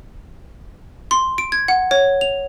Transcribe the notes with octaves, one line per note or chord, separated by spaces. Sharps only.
C6
D7
G#6
F#5
C#5
F7